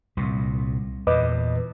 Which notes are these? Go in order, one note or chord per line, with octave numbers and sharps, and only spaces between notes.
C2 A#2
E2 A#2 B4 D#5 D6